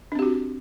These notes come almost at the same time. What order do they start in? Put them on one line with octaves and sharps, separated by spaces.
D4 C4 G4 F#4